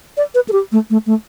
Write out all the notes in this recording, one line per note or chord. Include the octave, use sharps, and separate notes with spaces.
D5
B4
A4
G4
A3
A3
A3